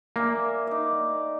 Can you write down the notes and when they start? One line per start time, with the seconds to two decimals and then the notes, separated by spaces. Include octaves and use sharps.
0.16 A#3 D5 E5 G#5
0.67 D#4 D5